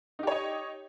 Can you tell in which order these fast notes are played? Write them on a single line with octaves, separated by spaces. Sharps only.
D#4 G4 C#5 D#5